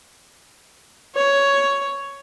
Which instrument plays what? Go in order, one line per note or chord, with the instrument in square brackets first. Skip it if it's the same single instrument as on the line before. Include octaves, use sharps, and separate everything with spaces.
[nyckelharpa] C#5